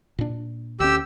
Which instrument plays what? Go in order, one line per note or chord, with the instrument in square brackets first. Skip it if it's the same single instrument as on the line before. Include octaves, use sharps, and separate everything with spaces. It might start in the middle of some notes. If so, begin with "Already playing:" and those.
[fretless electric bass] A#2 D4
[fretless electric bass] D2 C#4 [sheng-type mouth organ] G4 E6